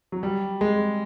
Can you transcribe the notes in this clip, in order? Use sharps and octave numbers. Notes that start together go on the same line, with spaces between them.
F#3
G3
G#3